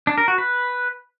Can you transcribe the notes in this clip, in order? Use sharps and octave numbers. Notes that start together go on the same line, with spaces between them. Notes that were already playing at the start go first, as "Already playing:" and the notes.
D4
A#4
F#4
B4